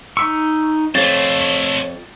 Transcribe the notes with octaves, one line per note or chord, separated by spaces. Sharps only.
D#4 C#6 E6 B6
F2 A3 C4 C#5 A6